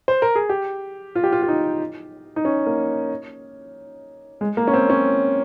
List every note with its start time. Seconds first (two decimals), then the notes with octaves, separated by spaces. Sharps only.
0.08 C5
0.22 A#4
0.35 G#4
0.49 G4
1.15 F4
1.24 G4
1.32 F4
1.43 F4
1.48 D#4
2.36 D#4
2.45 C#4
2.66 A#3
4.41 G#3
4.57 A#3
4.67 C#4
4.74 C4
4.90 C#4